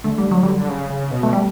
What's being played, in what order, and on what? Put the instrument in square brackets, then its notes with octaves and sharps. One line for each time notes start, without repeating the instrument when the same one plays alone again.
[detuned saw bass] D3 [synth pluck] A3
[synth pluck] G3
F#3
G3
[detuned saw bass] C#3
C#3
B2
[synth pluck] A3
G3